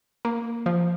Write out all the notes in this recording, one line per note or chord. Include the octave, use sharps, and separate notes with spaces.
A#3
F3